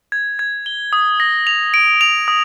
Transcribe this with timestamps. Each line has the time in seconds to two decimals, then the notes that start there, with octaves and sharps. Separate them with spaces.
0.12 G#6
0.39 G#6
0.66 G7
0.93 D#6
1.20 A#6
1.47 F7
1.74 D7
2.01 F7
2.28 D#6